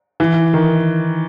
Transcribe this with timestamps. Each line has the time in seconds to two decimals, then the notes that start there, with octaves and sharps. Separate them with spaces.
0.20 E3
0.54 D#3